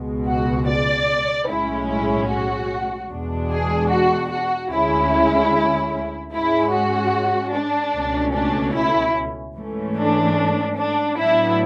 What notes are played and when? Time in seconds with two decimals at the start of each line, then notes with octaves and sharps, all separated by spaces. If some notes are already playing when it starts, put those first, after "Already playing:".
Already playing: C#2 B2 G#3
0.27 F#4
0.68 D5
1.48 B1 A2 G#3 C#4 E4
1.88 E4
2.29 F#4
3.10 E2 B2 G#3 D4
3.50 G#4
3.90 F#4
4.31 F#4
4.71 D2 D3 G#3 C#4 E4
6.33 G#2 G#3 C#4 E4
6.73 F#4
7.54 D4
7.94 C#2 B2 A3 C#4
8.34 D4
8.75 E4
9.56 G#2 E3 A3 C#4
9.96 D4
10.77 D4
11.17 A2 F#3 B3 D4 E4